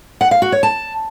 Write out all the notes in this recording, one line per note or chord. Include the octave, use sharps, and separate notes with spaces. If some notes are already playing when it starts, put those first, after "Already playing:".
F#5
F5
F#4
C#5
A5